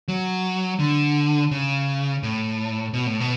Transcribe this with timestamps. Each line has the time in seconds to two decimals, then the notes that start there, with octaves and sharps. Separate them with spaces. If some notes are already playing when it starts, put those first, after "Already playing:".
0.08 F#3
0.79 D3
1.51 C#3
2.23 A2
2.93 B2
3.07 A2
3.20 B2